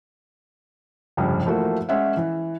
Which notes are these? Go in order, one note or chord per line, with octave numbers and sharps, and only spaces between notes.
F1 C#2 G2
E3 F3 A3 A#3 F#4
G#3 C#4 E5 F#5
E3